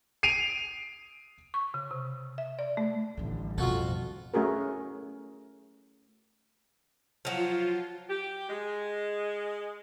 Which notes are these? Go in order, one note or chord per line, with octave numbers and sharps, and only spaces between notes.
C7 D7 D#7 F7
C#6
C#3
C3
E5
D5
A3
A1 D3 D#3 F3 G3
F2 B2 F3 F4 F#4 A4
A3 C#4 F#4 G#4 A#4
F3 F#3 F4
G4
G#3